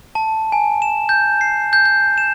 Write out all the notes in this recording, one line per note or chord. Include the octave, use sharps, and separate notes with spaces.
A5
G#5
E7
G6
C7
G6
G6
E7